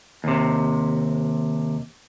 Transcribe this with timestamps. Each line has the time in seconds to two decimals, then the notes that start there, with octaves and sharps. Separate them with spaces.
0.24 D#2 C3